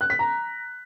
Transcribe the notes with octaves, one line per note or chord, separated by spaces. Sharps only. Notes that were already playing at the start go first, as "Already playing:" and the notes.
F#6
B6
A#5